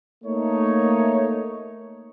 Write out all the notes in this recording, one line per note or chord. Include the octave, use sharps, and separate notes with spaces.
A3 A#3 D#4 C#5